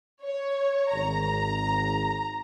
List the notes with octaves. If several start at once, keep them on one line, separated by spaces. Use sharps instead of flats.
C#5
G#1 A#5